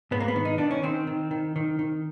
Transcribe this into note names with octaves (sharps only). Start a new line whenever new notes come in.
G#2 B3
A#3
B3
D#3
D#4
D#3 D4
C#4
D#3 C4
D#3
D#3
D#3
D#3